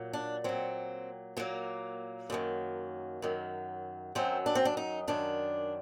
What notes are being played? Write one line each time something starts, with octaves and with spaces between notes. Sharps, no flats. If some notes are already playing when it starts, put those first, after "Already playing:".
Already playing: A#2 F#3
D4
A#2 F#3 C4
A#2 F#3 A#3
F#2 D#3 F#3
F#2 D#3 F#3
F#2 D#3 F#3 C4
D4
C4
D4
D#4
F#2 D#3 F#3 D4